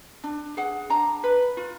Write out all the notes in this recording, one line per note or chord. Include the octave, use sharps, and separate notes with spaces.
D4
G#4 F#5
D4 A#5
B4
F4